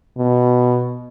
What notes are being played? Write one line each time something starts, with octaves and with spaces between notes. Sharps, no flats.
B2